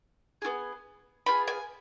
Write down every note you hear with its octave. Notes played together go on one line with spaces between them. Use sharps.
B3 F4 G#4
B3 F4 G#4 B5
G#5